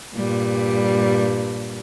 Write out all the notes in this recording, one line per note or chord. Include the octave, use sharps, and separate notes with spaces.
G2 A#2 G3